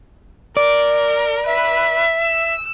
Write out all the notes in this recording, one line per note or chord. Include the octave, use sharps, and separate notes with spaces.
A#4 D5
B4 E5
E6